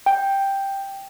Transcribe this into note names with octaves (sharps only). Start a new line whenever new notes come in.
G5